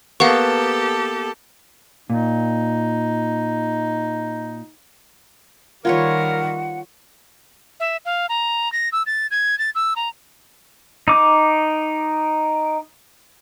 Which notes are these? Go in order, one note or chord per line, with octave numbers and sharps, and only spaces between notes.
A#3 B3 G4 A4 F5 F#5 A5 C#6
A#2 D#4
D#3 G3 F4 A#4 B4 C#5 F#5
E5
F5
A#5
A#6
E6
A6
G#6
A6
E6
A#5
D#4 D6